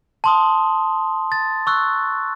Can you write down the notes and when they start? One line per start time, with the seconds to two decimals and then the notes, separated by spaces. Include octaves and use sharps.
0.24 A5 C6 D#6
1.32 A6
1.67 C#6 E6 F#6